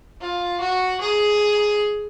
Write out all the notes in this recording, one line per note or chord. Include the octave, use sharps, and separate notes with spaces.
F4
F#4
G#4